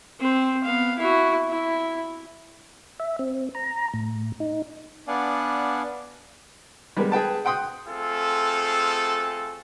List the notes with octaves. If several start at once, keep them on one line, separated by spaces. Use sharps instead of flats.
C4 C5
B3 F5
E4 F#4
E4
E5
C4
A#5
A2
D#4
B3 D4 D5 F5 F#5 G#5
G3 G#3 B3 A#4
G#4 B4 G5 A5
F#5 G5 C6 D#6 F#6
A3 C4 F4 G#4 A4